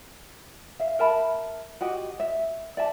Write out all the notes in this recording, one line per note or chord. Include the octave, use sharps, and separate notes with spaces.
E5 F5
A#4 E5 A5 B5
F#4 G4 D#5
E5
D5 E5 A5